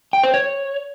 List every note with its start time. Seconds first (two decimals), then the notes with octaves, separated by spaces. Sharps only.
0.13 G5
0.23 C5
0.34 C#5